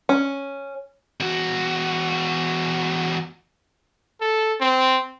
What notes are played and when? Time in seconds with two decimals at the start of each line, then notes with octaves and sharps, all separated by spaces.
0.09 C#4
1.20 E2 F#4
4.21 A4
4.61 C4